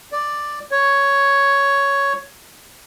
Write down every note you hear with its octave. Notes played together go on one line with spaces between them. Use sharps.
D5
C#5